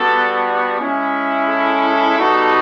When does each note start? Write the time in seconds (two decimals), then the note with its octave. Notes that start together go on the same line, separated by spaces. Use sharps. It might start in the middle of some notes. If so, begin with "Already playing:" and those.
Already playing: G3 B3 D4 F#4 A4
0.79 G#3 C#4 E4
1.48 A4
2.17 G3 B3 D#4 F#4